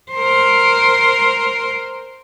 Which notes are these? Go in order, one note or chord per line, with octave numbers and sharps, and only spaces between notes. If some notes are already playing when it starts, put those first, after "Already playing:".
A#4 C5